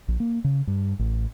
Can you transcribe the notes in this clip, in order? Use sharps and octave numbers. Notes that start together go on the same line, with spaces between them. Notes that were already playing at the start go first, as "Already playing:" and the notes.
A#1
A#3
C#3
G2
A1